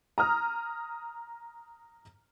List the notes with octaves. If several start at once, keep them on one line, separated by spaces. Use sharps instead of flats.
A#5 D#6 F6